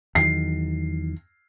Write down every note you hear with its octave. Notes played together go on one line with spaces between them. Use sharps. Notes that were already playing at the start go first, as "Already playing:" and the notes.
E2 D#3 F#3 C7